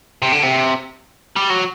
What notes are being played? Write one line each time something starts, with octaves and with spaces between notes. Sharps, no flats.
C3
D3
C3
G3
F#3